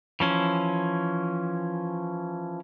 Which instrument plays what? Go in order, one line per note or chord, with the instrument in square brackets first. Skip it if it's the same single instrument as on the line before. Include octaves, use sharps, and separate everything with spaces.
[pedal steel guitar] E3 F3 C#4